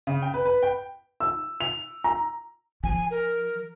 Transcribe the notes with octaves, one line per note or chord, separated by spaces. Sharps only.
C#3
G5
B4
B4
G5
E6
F7
A#5
F3 G#5
A#4